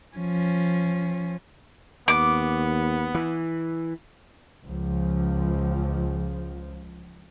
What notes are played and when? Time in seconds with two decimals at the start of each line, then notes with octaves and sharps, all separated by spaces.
0.16 F3 C#4
2.08 D#2 B3 D6
3.15 E3
4.65 C#2 F3